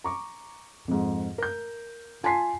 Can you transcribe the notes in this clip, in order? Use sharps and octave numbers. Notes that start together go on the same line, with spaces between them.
A#5 C#6 D6
F2 G#2
A#4 G6
F4 G#5 A5 C6 B6 C7